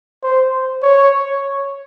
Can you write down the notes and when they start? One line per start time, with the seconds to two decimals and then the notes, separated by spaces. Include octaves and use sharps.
0.23 C5
0.83 C#5